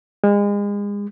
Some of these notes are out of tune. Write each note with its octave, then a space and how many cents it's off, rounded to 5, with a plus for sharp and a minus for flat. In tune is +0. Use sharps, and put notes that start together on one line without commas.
G#3 -35